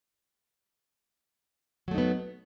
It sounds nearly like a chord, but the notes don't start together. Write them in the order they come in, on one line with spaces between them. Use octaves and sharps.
F#3 A3 D#4 B3